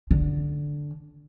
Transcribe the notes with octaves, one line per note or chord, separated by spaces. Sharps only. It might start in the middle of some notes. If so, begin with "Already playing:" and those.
D3